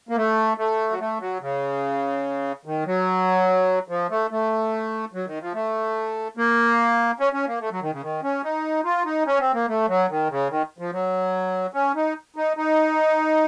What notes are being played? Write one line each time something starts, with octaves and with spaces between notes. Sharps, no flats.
A#3
A3
A3
F#3
A3
F#3
C#3
D#3
F#3
F3
A3
A3
F#3
D#3
F3
A3
A#3
C#4
C#4
A#3
A3
F#3
D#3
C#3
D#3
C#4
D#4
F4
D#4
C#4
C4
A#3
A3
F#3
D#3
C#3
D#3
F3
F#3
C#4
D#4
D#4
D#4